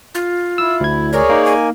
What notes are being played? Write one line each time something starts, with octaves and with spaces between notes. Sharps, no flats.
F4
E4 E6
D2 G#6
G#4 A#4 C#5 D5
A#3 D#4
G#5